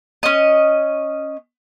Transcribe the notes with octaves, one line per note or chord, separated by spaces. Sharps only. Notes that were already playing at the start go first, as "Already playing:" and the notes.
C#4 D#5